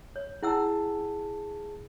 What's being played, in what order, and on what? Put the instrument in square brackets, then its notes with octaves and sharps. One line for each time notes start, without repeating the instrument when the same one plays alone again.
[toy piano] C#5
[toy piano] E4 F#5 E6 [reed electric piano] G#4 A5